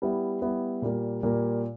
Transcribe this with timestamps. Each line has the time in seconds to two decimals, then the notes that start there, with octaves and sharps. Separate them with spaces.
0.02 G3 B3 E4
0.42 G3 B3 E4
0.82 A#2 G3 A#3
1.23 A#2 G3 A#3